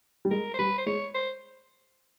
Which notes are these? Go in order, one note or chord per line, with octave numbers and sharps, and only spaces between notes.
G3
G#3 A#4
C5
G3 B4
C5
G#3 C#5
C5